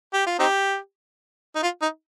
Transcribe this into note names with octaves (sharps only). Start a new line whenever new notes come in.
G4
F4
C4 D#4 G4
D#4
F4
D#4